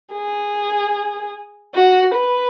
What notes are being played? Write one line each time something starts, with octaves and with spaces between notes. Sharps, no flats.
G#4
F#4
B4